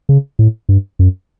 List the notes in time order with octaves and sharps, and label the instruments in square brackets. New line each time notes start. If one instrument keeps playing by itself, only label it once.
[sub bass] C#3
A2
G2
F#2